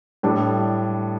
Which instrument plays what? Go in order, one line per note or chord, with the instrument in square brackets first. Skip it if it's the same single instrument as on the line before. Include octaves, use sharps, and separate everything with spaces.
[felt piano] A2 G3 D4 A4